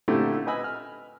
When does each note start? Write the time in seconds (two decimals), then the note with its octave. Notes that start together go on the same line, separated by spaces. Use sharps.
0.08 A#2 D3 A3 C4 E4 G4
0.47 B4 D#5 G#5 B5 E6
0.64 F6